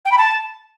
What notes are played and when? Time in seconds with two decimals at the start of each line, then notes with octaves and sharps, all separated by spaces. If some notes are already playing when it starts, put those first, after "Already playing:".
0.05 G5
0.11 B5
0.17 A5